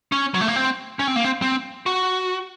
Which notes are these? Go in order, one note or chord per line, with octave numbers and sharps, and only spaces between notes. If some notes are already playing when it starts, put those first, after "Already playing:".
C#4
F#3
A3
A#3
C4
C#4
C4
A#3
C4
C4
F#4